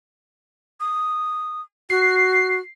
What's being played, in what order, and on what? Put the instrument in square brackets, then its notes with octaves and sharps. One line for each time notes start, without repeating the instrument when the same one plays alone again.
[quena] D#6
[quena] F#4 [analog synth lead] C7